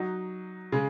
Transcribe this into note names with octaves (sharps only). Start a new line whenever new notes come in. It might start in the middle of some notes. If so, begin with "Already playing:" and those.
Already playing: F#3 D#4 F#4
C#3 G#3